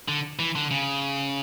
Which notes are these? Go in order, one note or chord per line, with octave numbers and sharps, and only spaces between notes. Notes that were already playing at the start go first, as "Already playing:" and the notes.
D3
E3
D3
C#3